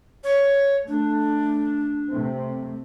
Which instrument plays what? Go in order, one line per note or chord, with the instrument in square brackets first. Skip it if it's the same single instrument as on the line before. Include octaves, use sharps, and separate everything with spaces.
[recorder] C#5
[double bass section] A3 [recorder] D4
[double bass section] C3 A3 C4